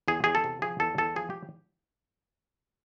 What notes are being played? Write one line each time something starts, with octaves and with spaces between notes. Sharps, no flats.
E2 G#4
E2 G#4
A4
C3
F3 G#4
E2 A4
E2 A4
F3 G#4
G4